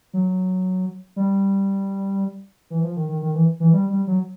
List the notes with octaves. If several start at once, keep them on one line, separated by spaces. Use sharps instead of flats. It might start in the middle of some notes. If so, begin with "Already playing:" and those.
F#3
G3
E3
F3
D#3
D#3
D#3
E3
E3
G3
G3
F#3